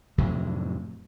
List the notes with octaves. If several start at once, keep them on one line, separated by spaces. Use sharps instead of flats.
F2 A2 C3 F#3